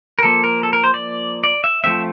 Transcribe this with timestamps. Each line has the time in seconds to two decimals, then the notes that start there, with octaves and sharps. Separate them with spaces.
0.19 A#4
0.23 F3 A#3 A4
0.44 A#4
0.63 A4
0.73 A#4
0.84 C5
0.94 D5
1.44 D5
1.64 E5
1.84 F3 A3 C4 E5